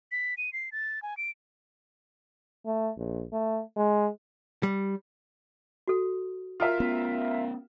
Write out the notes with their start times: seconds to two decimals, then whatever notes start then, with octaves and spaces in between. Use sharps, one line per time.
0.12 B6
0.38 D#7
0.53 C7
0.72 A6
1.02 G#5
1.17 D7
2.66 A3
2.97 A#1
3.33 A3
3.76 G#3
4.63 G3
5.88 F#4 A4
6.60 F4 A#4 E5
6.80 B3 C#4